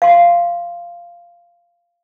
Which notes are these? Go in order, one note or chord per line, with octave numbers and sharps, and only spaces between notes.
F5 C6